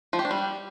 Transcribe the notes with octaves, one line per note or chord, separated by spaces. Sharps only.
F3
G4
D4
G3